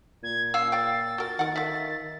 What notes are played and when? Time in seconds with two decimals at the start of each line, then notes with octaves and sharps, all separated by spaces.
0.23 A#2 G#6
0.54 C#4 F4 F5 E6 C7
0.72 C#5 F5 G5 A6
1.18 F#4 A#4
1.39 D#3 A#4 F#5
1.56 D3 E5 F5